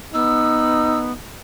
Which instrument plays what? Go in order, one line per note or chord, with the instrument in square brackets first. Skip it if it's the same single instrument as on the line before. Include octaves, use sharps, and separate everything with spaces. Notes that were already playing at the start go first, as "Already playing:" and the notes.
[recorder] B3 [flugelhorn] D#4 [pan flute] E6